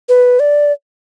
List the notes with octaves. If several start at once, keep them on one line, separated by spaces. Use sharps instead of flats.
B4
D5